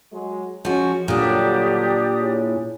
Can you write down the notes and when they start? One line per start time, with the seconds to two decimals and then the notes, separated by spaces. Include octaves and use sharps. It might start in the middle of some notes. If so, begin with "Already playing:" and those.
0.12 F#3 G#3
0.65 F3 G#3 C#4 F#4
1.08 G2 A#2 D3 F#3 D4 G4 D5 D#6
2.20 E4 G#4 C#5